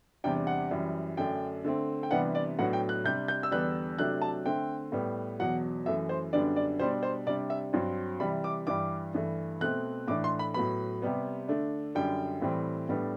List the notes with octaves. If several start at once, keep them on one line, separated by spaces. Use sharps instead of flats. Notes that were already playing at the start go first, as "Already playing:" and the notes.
E2 C3 G3 D4 G5
F#5
F#2 E3 G3
F#2 D3 A3 D4 G5
D3 A3 C4
G5
C3 E3 G3 B3 D4 F#5
D5
A2 F#3 B3 D4 F#5
G5
F#6
C3 G3 D4 G6
G6
E6
E2 D3 G3 B3 D4 F#6
C3 F#3 A3 D4 F#6
A5
D3 A3 C4 G5
A2 G3 B3
E2 B2 F#3 F#5
F#2 E3 A3 E5
C5
F#2 D3 G3 B3 D4 D5
D5
B2 G3 D4 C5
C5
C3 G3 D4 D5
E5
G2 F#3 C4
C3 E3 G3 B5
D6
G2 E3 G3 D6
G2 E3 A3
B2 A3 C4 F#6
A2 E3 A3 D4 D6
C6
B5
A2 F#3 B3 B5
C3 G3 B3
D3 A3 D4
F#2 D3 G3 G5
A2 E3 G3 C4
A2 G3 B3 D4